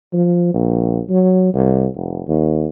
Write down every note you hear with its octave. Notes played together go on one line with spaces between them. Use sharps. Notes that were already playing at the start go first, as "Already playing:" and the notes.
F3
A#1
F#3
C2
F1
D#2